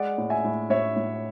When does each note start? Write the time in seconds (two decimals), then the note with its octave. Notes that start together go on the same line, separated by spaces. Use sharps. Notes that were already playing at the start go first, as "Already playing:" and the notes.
Already playing: G#3 D5 F#5
0.18 A2
0.30 E5 G#5
0.44 A2
0.70 A2 C#5 E5
0.96 A2